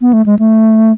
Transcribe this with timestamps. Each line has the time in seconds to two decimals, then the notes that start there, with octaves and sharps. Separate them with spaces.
0.01 B3
0.13 A3
0.26 G#3
0.39 A3